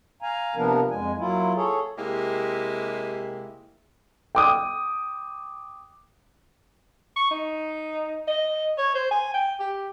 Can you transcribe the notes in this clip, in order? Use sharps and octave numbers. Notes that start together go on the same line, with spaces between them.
F5 G#5 A#5
C3 F3 A#3 B3 D4 A#4
F2 G#3 G#5
F#3 A#3 E4 F4
G#4 A4 C#5
C3 G#3 A#3 E4 G4
G5 D6 D#6
C#6
D#4
D#5
C#5
C5
G#5
G5
G4